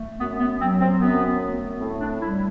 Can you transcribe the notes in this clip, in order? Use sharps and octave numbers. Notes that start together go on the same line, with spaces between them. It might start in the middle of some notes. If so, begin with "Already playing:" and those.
Already playing: A3
F#2 B3
B3
F#3 C4
C4
F#2 B3
A3
A2 C4
D4
G3 E4